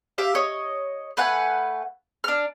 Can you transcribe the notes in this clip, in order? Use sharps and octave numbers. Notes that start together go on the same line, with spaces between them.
G4 E5 F5
C#5 D#5
A3 B4 F#5 G#5
D4 F6